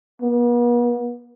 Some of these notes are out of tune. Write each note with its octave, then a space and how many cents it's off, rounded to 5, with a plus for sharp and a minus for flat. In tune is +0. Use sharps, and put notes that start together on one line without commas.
B3 -45